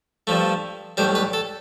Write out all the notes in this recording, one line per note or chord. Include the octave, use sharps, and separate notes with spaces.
G2 F3 A3
B1 A2 G3 C5
B4
A4